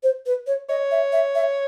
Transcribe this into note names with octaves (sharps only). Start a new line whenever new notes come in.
C5
B4
C#5
C#5 D#5
E5
E5
E5